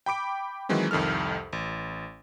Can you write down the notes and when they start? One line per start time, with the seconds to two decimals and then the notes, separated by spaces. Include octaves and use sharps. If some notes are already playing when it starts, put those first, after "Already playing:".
0.06 G5 B5 D6 D7
0.69 D#3 E3 F#3 G#3 C4
0.91 C2 F2 D#3 A4 F6
1.53 A1